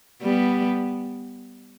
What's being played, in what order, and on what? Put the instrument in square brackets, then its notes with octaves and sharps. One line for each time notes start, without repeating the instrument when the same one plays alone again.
[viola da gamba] G3 B3